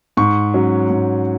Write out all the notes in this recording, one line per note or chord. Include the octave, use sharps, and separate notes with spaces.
G#2 C#6
F#3 C#4
G#2